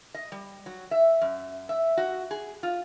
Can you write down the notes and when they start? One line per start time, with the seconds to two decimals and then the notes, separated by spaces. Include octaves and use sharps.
0.14 D#5
0.32 G3
0.66 F#3
0.91 E5
1.21 F#2
1.69 E5
1.97 F#4
2.31 G#4
2.63 F4